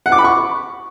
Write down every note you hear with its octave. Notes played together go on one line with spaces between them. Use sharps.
F#5
D6
B5
C#6